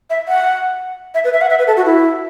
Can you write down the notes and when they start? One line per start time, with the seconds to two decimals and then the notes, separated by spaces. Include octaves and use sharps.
0.10 E5
0.28 F#5
1.14 E5
1.24 B4
1.33 E5
1.41 F#5
1.50 E5
1.59 B4
1.67 A4
1.77 F#4
1.85 E4